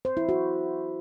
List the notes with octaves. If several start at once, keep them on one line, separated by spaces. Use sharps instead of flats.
C5
E4
F#4